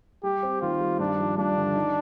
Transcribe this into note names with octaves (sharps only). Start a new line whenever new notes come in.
G3 G4
C4
D#3 F4
G3
G2 D4
F3
G2 D4
D3
D#4